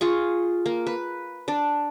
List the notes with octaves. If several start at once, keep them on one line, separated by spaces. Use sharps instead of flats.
F4 G#4 C#6
A#3
B4
D4 D5